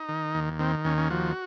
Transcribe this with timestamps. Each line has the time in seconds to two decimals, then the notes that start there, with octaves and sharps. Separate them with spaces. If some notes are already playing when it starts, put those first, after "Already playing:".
Already playing: D#4
0.09 D#3
0.35 D#2
0.59 D#3 C4
0.85 D#2 C#4
0.98 C#4
1.10 F3 F#4